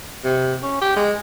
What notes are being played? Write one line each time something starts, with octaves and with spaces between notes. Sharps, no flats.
C3
C#4
G4
G#3